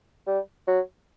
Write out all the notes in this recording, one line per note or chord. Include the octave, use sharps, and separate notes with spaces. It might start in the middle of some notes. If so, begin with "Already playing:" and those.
G3
F#3